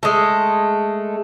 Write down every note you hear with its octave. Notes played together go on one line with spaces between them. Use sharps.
G#3 A3